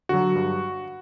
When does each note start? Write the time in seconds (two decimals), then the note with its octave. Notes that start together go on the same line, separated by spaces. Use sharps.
0.09 D3 F#3 F#4
0.35 G2